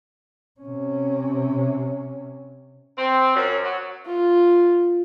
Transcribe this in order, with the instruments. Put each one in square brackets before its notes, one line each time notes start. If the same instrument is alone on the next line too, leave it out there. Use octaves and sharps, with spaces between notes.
[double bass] C3 C#4
[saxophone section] C4
F#2
F#3
[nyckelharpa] F4